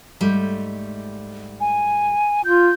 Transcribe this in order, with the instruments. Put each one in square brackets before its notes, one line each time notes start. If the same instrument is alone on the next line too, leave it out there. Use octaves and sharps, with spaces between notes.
[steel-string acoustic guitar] G#2 G3 A3
[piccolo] G#5
[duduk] F4 [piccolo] G6